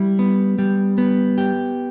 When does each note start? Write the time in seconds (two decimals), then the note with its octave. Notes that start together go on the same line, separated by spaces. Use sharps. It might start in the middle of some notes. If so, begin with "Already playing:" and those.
Already playing: G3 E4
0.19 B3
0.59 G3
0.98 B3
1.38 G4